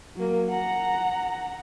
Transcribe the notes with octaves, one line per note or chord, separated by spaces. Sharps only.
F#3 A#3
F#5 A#5